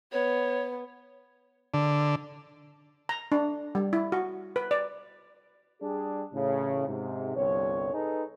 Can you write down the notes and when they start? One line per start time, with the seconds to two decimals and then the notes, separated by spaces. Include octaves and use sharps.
0.12 B3 C#5
1.74 D3
3.09 A#5
3.32 D4
3.75 G3
3.93 E4
4.12 F#4
4.56 B4
4.71 D5
5.81 G3 D4 G#4
6.33 A1 A2 C#3
6.86 G#2 C3
7.36 G1 C2 C#5
7.94 D#4 G#4 A4 B4